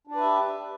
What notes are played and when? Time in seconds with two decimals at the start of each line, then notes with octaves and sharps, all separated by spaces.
0.07 D4
0.11 D5
0.15 B4
0.19 E5
0.23 G4